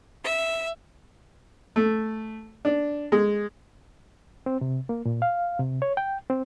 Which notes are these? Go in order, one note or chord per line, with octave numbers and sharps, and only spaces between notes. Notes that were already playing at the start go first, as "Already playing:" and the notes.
E5
A3
D4
G#3
C4
C3
A#3
A#2
F5
C3
C#5
G5
C4